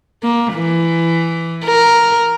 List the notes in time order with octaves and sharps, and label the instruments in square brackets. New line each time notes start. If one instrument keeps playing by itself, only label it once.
[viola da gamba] A#3
E3
A#4